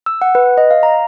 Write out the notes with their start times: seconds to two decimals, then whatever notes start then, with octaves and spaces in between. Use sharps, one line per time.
0.06 E6
0.22 F#5
0.35 B4
0.58 D#5
0.71 F5
0.83 A#5